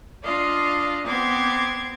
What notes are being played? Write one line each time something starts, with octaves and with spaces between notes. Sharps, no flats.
D4 F4 D5 D#5 F5
B3 C4 C6 D6 G#6